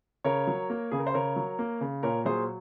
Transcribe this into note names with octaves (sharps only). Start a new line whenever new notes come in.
C#3 A#4 C#5
F#3
A#3
C#3 G#4
A#4
C5
C#3 A#4 C#5
F#3
A#3
C#3
A#2 A#4 C#5
F#3 G#4 C5